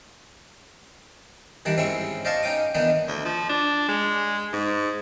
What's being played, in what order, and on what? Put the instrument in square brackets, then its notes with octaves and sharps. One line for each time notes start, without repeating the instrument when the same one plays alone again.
[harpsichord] D#3 E3 G3 D4
G#2 C4 C#4 E4 C#6
C5 D5 D#5 F5 A5 C#6
C#4 D#4 G5 D6 D#6
D#3 E3 B3 D4 D#4
[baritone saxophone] D2
F3
D4
G#3
G#2